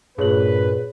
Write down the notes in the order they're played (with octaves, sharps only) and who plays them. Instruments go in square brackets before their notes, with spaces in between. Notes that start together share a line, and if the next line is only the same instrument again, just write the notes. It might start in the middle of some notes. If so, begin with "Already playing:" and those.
[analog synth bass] G2 [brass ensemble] A#2 B4 [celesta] G#4 C#5 F#7